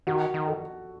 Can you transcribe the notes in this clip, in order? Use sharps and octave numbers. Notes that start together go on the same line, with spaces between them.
D#3 F#4
D#3
A4